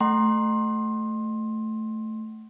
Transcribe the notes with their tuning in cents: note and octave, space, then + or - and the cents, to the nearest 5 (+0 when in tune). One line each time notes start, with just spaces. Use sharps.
A3 +0 F#5 +30 C6 +20